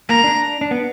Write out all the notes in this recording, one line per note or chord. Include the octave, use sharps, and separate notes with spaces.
A#3 A#5
D4
D4
B3